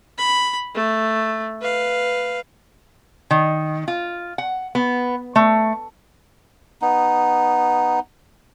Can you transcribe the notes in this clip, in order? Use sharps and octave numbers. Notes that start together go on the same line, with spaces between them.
B5
A3
B4 F5
D#3
F4
F#5
B3
A3
B3 D#4